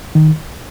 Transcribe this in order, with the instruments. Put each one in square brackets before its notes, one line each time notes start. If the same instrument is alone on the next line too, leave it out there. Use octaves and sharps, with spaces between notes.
[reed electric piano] D#3